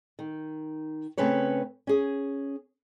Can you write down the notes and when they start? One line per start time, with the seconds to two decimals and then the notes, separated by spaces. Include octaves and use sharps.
0.19 D#3
1.18 C#3 A3 C4 C#4 B4 C#5
1.87 C#4 G#4